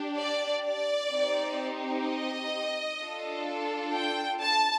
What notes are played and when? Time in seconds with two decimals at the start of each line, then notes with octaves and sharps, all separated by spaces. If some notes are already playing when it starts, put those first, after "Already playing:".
Already playing: D4 G4
0.19 D5
0.65 D5
1.12 C4 D#4 G4
2.07 D#5
3.00 D4 F4 A4
3.95 G5
4.42 A5